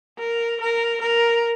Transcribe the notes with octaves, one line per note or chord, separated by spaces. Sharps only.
A#4
A#4
A#4